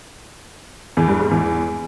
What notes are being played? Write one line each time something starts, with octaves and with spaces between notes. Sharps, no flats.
E2
G2
G#2
E2